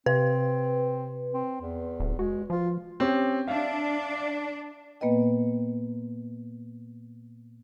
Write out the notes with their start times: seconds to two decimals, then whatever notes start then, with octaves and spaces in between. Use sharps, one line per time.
0.06 C3 C4 B4
1.34 C4
1.61 E2
2.00 D1
2.19 G#3 F#4
2.50 F3 F4
3.00 C4 C#4 G4
3.48 D4 E5 F5
5.01 A#2 A#3 B3 B4 D#5 G5